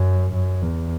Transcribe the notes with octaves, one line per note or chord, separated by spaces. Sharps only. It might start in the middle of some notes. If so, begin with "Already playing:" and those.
Already playing: F#2
F#2
E2